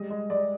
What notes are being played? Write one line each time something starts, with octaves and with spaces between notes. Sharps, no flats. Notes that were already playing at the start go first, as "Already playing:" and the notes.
Already playing: G3 G#3 D#5
G#3
G#3 D5